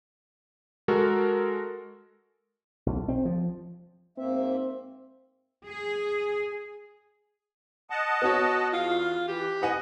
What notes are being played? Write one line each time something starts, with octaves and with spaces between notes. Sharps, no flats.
G#3 F#4 A4 A#4
B1
C4
F3
G#2 A#3 C4 E5
G#4
D#5 F#5 A5
B3 F#4 C#5
E2 F4 F5
E3 G4
B4 D#5 F#5 G#5